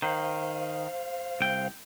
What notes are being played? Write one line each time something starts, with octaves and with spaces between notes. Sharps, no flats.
D#3 C5 F5
C2 G5